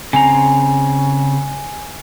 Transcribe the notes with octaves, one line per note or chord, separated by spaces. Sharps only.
C#3 C4 G#5 A#5